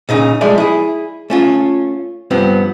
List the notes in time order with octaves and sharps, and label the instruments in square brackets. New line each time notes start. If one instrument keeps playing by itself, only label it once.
[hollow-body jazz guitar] A#2 C#3 D#4
F3 G#3 A3 G#4 D5
E4 G#4
A3 C#4 F4
G2 F3 B3 C4